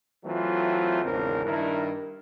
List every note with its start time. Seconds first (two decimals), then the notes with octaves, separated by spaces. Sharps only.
0.25 E3 F#3 A3 C4 F4
1.03 G#1 E2 C#3 C4 D4 A#4
1.45 G2 D#3 D4 E4 A#4